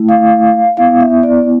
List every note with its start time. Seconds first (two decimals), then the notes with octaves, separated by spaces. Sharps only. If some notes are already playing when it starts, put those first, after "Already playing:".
Already playing: A3 E4
0.09 F5
0.77 B3 E4 F5
1.00 E5
1.23 D5